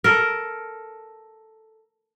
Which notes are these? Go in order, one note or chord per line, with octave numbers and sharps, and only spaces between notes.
A4 A#4